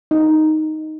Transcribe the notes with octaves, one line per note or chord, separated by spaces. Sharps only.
D#4